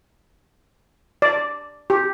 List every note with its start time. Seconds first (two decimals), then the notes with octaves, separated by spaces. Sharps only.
1.22 D5
1.90 G4